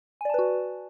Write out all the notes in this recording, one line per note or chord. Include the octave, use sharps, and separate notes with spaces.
F#4 B4 D5 G#5 A5